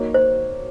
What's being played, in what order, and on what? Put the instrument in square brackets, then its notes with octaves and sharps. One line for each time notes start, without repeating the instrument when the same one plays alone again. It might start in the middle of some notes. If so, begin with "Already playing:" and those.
Already playing: [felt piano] A#3 D#4 F#4 A#4 C#5
[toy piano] C5